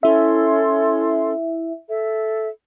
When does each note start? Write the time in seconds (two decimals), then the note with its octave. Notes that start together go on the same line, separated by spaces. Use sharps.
0.03 C#4 E4 A4 E5 C6
1.88 A4 E5